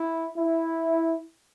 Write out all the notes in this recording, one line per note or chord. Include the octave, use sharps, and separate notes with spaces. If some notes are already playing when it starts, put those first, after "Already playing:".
Already playing: E4
E4